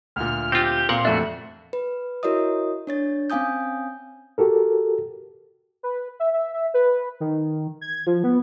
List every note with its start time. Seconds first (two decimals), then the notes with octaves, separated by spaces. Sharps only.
0.16 D2 A#2 F6
0.52 C4 F4 G4
0.89 A#2 C4 A#4 F5 F#5 C6
1.05 F2 A3 D4 F#4 E5
1.73 B4
2.23 E4 F#4 A#4 C#5 D#5 D#6
2.87 D4 C#5 A6
3.30 C4 C#4 F5 G#5 D#6 G6
4.38 F#4 G4 A4 A#4
5.83 B4
6.20 E5
6.33 E5
6.53 E5
6.74 B4
7.20 D#3
7.81 G#6
8.07 F3
8.24 B3